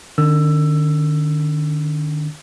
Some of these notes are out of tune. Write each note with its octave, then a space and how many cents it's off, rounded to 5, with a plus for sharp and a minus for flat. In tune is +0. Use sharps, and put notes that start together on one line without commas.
D#3 -45 C#4 +25 E6 +15